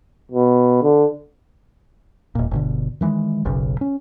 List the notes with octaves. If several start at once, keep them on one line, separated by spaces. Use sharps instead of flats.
B2
D3
E1 A#2
G1 B2 D3
D#3 E3 G#3
F#1 B1 F#2 C#3
C#4